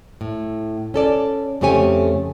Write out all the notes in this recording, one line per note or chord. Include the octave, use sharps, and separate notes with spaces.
A2
C#4 A4 D5
F2 C#3 A3 G4 C#5 G#5